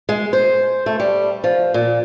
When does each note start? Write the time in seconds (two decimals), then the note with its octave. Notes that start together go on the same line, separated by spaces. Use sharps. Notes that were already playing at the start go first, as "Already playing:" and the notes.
0.09 G#3
0.33 C5
0.86 A3
1.00 G3
1.44 F3
1.74 A#2